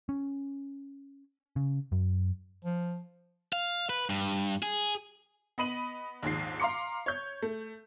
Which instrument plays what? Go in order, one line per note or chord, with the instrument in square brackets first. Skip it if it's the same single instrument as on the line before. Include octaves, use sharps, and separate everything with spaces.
[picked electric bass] C#4
C#3
F#2
[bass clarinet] F3
[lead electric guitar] F5
B4
G2
G#4
[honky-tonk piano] B3 D#5 B5 D#7 F#7
A#1 D#2 G#2 C7
F5 A#5 C6 D6 C#7
C#5 G6
A3